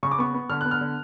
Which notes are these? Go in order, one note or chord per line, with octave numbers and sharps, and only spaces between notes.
C#3 C#6
D6
B3 C#6
B3
D3 F6
B3 F#6
F6
D3